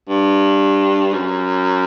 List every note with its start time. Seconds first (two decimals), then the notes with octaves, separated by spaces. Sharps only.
0.09 G2
1.13 F#2